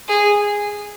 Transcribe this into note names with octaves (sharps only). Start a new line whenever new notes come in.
G#4